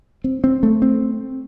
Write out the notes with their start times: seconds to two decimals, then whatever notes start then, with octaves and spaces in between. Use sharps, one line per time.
0.24 C4
0.44 C4
0.63 A3
0.82 C4